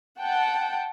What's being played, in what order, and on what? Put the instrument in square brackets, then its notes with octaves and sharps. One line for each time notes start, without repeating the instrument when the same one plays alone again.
[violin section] F#5 G5 A5